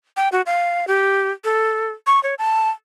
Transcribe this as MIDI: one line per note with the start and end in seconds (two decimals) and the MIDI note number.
0.17 0.29 79
0.32 0.41 66
0.46 0.86 77
0.88 1.31 67
1.44 1.90 69
2.07 2.22 85
2.23 2.35 73
2.39 2.70 81